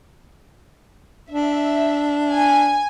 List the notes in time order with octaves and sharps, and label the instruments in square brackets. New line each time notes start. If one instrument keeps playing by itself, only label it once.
[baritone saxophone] D4 [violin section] E5
[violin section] G#5